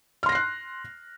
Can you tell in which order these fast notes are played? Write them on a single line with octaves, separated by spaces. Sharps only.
F6 C6 A#6 C7 F#6